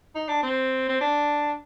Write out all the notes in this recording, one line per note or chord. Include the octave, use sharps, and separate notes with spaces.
D#4
D4
C4
C4
D4